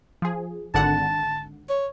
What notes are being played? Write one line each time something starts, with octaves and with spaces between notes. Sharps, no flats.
F3 G#4
G#1 D3 F#5 A5
C#5